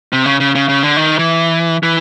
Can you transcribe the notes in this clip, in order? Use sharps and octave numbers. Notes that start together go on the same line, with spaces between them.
C3
C#3
C#3
C#3
C#3
D3
D#3
E3
E3